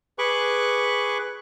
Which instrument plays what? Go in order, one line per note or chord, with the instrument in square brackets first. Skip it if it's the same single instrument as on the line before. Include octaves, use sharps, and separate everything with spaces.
[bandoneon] G#4 B4 C#6 D6 F#6